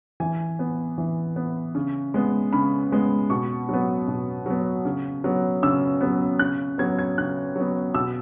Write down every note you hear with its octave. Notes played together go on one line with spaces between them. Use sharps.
E3 G#5
B3
E3
B3
C#3
G#3 B3
C#3 B5
G#3 B3
B2 C#6
F#3 B3
B2
F#3 B3
C#3
F#3 B3
C#3 E6
F#3 B3
C#3 F#6
F#3 B3 G#6
G#6
C#3 F#6
F#3 B3
B2 E6